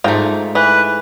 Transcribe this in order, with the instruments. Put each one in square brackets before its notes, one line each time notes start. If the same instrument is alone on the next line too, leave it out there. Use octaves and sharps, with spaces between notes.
[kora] G#2 A3 [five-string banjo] F4 A#4 G5
[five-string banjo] E3 [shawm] B4